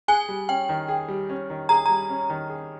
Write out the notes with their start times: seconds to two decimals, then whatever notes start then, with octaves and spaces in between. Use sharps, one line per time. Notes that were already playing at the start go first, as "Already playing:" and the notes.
0.08 G#4 G#5
0.29 G3
0.49 C#4 G5
0.69 D#3
0.88 G#4
1.08 G3
1.29 C#4
1.50 D#3
1.69 G#4 A#5
1.86 G3 A#5
2.09 C#4
2.30 D#3
2.49 G#4